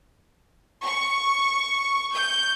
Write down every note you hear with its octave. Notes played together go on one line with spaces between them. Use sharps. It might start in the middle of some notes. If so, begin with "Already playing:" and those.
C#6
G6